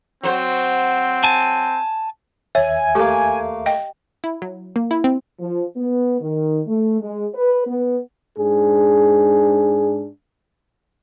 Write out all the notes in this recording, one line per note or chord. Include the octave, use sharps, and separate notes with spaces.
F#3 C4 C5
G#5 A5
D#2 C#5 E5 G#5
A3 A#3 G4
D#5 G5
E4
F#3
A#3
E4
C4
F3
B3
D#3
A3
G#3
B4
B3
G#2 D4 G#4